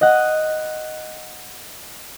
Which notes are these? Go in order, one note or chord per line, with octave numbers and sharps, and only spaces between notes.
D#5 F#5